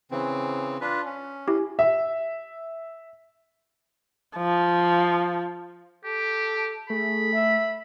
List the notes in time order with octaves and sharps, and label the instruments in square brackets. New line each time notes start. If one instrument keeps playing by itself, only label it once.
[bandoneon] C#3 E3 C4
D4 F4 B4
C#4
[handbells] E4 G4
[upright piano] E5
[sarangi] F3
[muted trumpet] G4 [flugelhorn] A4
[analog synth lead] A3 [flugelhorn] G#4 [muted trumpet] B5
[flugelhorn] E5